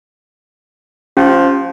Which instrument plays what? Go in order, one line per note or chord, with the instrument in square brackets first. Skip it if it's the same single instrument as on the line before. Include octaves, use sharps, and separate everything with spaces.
[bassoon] F3 [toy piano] C#4 G4